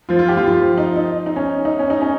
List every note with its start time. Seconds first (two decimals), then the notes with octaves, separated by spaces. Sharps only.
0.09 F3 F4
0.19 F4
0.28 G4
0.37 F3 F4
0.48 F3 F4
0.78 D#4
0.96 D#4
1.26 D#4
1.36 C#4
1.65 D#4
1.79 C#4
1.90 D#4
2.01 C#4